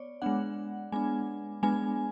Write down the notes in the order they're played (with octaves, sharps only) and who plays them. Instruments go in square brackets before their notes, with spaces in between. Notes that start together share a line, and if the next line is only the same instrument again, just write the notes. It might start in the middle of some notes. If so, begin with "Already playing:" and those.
Already playing: [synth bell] B3 C#5 D5
G#3 B3 D4 F#5
G#3 B3 D4 G#5
G#3 B3 D4 G#5